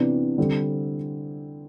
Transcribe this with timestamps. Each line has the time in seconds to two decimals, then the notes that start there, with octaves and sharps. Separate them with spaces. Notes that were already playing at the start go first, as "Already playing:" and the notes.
Already playing: C3 E3 B3 D4
0.38 D3 G3 C4